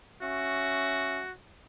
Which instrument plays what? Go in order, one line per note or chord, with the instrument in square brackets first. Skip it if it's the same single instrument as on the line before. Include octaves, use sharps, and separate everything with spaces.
[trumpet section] C#4 E5 [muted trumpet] F#4